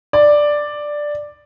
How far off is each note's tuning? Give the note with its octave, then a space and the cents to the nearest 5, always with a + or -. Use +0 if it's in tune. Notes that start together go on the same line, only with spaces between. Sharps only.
D5 +5